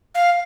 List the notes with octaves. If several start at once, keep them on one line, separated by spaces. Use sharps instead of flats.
F5